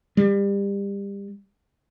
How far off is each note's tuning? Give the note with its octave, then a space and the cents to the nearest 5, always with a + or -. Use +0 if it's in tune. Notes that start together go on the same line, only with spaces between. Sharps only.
G3 +30